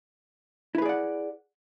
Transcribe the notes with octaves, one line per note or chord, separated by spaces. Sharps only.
E4 G#4 B4 D5 F#5